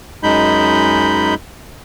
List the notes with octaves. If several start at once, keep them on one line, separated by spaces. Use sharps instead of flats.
F#2 G#3 D#4 B5 G6